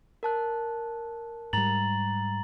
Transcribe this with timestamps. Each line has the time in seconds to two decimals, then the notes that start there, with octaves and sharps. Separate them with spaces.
0.23 A#4 A5 F#6
1.53 G#2 G3 A#5 A6 F#7